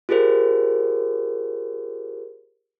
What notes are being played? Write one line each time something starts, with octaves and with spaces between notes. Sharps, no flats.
F4 G4 G#4 A#4 C5